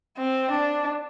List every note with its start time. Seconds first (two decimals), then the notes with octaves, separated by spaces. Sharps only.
0.18 C4
0.51 D4